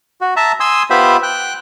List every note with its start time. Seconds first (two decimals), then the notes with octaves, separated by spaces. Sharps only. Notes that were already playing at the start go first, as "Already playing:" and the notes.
0.21 F#4
0.36 E5 A5 A#5
0.60 G#5 C6 D#6 E6
0.90 B3 F4 G4 C5 E5 B5
1.23 G5 F#6